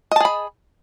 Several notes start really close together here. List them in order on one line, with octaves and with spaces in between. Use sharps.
D#5 A5 G#4 B5